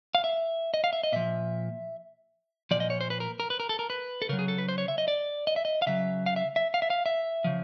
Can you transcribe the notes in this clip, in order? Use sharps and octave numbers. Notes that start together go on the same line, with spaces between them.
F5
E5
D#5
F5
E5
D#5
A#2 F3 E5
A#2 F3 D5
D#5
C#5
C5
B4
A#4
A#4
B4
A#4
A4
A#4
B4
A4
C#3 F#3 A#4
G#4
A4
B4
C5
C#5
E5
D#5
D5
D#5
E5
D#5
F5
C#3 F#3 E5
F5
E5
E5
F5
E5
F5
E5
C#3 F3